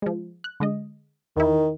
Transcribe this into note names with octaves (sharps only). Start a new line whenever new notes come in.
F3 G#3
F#6
D3 G#3 D#5
E2 D#3 E4